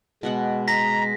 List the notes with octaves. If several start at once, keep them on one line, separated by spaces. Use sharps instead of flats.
B2 G#3 B3 F#5
A#5 A#6 B6